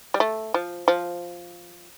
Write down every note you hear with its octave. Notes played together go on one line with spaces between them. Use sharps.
G3
A3
F3
F3